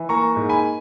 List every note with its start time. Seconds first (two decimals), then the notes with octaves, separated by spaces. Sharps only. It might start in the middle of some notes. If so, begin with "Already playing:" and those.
Already playing: E3
0.09 A#3 A#5 C#6
0.36 G#2
0.49 G#5 B5